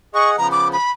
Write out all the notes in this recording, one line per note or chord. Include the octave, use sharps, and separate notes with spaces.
G#4 D#5 F#5 C#6
C#3 F3 B3 A#5
D6
B5